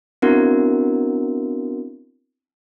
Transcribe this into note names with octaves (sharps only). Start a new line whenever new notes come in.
B3 C4 D4 E4 F#4 A#4